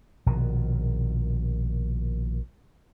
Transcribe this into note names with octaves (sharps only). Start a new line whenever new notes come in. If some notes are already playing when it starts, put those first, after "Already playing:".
A#1 B2 D#3